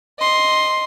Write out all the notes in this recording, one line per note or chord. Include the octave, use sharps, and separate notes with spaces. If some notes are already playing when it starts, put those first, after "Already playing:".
D#5 C6